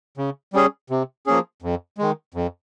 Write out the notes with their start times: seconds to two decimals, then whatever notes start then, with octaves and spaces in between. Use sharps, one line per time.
0.17 C#3
0.53 G3 C#4 G#4
0.90 C3
1.26 F3 A#3 C#4 G#4
1.62 F2
1.98 D#3 G#3
2.34 F2